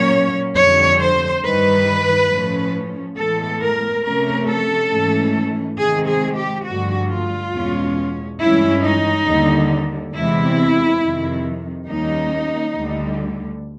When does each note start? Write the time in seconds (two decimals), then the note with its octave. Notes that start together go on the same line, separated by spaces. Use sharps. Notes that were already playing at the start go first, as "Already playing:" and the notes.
Already playing: A#2 F#3 A#3 C#4 C#5
0.56 F2 D3 G3 C#5
1.00 C5
1.43 G2 D#3 G3 B4
2.29 A2 F3 A3 C#4
3.17 A2 E3 G#3 B3 A4
3.61 A#4
4.03 C3 F3 A3 C#4 A#4
4.48 A4
4.91 G#2 E3 A3 C#4
5.78 C3 D#3 G#3 C4 G#4
6.07 G#4
6.36 G4
6.66 G2 D3 F3 A3 F#4
7.08 F4
7.53 E2 B2 G#3 C#4
8.39 G2 E3 G#3 C#4 E4
8.83 D#4
9.27 D#2 D3 G3
10.13 E2 C3 E3 G#3 C4 E4
11.01 F2 C3 D#3
11.87 D#2 D#3 G3 A#3 C#4 D#4
12.75 D2 D3 G3